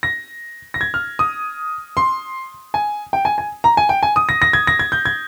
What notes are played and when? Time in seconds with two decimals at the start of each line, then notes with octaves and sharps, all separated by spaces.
0.03 A#6
0.74 A#6
0.81 G#6
0.94 F6
1.19 D#6
1.97 C6
2.74 G#5
3.13 G5
3.25 G#5
3.38 G#5
3.64 A#5
3.77 G#5
3.89 G5
4.03 G#5
4.16 D#6
4.29 A#6
4.42 A#6
4.53 G#6
4.67 A#6
4.79 G#6
4.92 G6
5.05 G#6